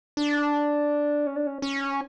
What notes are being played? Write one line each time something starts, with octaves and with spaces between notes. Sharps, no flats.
D4
C#4
D4
C#4
C#4